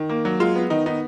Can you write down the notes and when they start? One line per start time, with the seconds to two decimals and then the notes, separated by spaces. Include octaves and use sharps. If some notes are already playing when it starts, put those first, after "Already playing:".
Already playing: D#3
0.09 A#3
0.25 F#3
0.40 G#3 F4
0.55 B3
0.70 D#3 D#4
0.86 B3 D#4